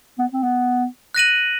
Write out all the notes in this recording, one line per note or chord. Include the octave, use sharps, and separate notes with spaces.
B3
C4
B3
F#6 A#6 D#7 F#7